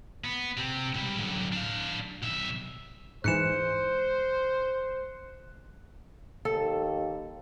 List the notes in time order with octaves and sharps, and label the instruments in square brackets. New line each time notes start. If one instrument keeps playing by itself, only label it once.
[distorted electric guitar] B3
C3 C4
G#2 G3
F#2 D3
D4 F5
B1 E5
[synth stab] G#2 E3 [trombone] C5 [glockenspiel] F#6 C#7 E7
[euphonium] D#2 [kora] A4